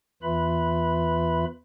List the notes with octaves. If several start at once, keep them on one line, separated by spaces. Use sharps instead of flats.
E2 E3 F4 B4 E5 B5